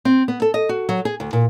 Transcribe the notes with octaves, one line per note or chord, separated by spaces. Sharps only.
C4
B3
A4
D#5
F#4
F#3
G#4
D2
A#2